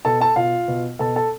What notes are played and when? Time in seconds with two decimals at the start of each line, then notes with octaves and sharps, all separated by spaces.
0.05 B2 A4 A5
0.21 A4 A5
0.36 B2 F4 F5
0.68 B2
0.99 B2 A4 A5
1.16 A4 A5